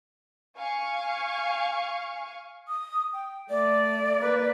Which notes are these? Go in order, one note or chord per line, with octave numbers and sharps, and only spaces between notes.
F5 G#5 C#6
D#6
G5
A3 D5
A#3 B4